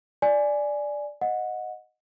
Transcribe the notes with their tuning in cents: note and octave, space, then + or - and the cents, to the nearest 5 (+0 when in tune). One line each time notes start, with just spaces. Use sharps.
D5 +0 G#5 +5
D#5 +0 F#5 -20